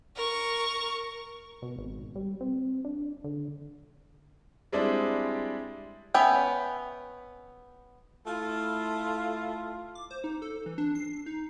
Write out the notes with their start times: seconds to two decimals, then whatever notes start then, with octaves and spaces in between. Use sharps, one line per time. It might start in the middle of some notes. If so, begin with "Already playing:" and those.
0.16 A#4 C#6
1.62 B2
1.78 G#1
2.15 G3
2.41 C4
2.85 D4
3.24 D3
4.72 G3 G#3 C4 D4 E4 D5
6.14 B3 C#4 C#5 E5 G5
8.27 A3 E4 F4
9.95 D6
10.11 C5
10.24 D#4
10.42 A4
10.66 E3
10.78 D4
10.95 C7
11.26 D#4